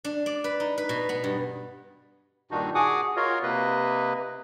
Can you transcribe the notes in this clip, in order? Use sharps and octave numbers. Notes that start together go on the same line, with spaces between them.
D4
D5
B4
D#4
B4
B2
B3
G2
G2 A#2 D#3 D4 D#4 F#4
F#4 G#4 F#5 G#5 D6 D#6
F4 F#4 A#4 C#5 D#5 F5
C3 A#3 B4 D#5